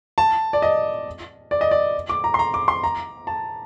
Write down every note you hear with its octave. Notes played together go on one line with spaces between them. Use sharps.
A5
D5
D#5
D5
D#5
D5
D6
A#5
C6
A#5
D6
C6
A#5
A5